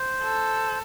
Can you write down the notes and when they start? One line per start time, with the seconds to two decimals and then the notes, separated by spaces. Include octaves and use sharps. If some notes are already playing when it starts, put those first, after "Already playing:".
Already playing: C5
0.23 A4